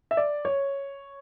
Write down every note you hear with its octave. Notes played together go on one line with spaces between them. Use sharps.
E5
D5
C#5